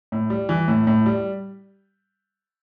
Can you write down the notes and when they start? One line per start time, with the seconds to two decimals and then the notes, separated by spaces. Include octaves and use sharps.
0.12 A2
0.30 G3
0.49 E3
0.68 A2
0.87 A2
1.06 G3